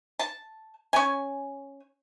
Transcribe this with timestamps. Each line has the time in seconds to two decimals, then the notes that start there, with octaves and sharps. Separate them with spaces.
0.19 A5
0.93 C#4 G#5